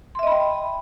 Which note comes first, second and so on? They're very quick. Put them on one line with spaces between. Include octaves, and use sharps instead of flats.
C6 E5 D#5 B5 G5